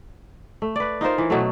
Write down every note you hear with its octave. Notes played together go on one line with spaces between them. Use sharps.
A3
B4 D5
D#4 F4 A#4 C5
E3
B2 F#3 A3